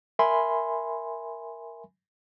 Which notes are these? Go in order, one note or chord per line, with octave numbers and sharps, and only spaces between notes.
A#4 E5 G#5 B5 C6